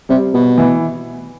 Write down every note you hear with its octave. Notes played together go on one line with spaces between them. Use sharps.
C3 G3
B2
E3